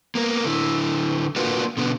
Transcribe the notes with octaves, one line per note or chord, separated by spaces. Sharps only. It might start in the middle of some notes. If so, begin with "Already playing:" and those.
A#3 B3 A#4
D3 E4
A#3 D4 F4 F#4 A#4 B4
B2 D3 B3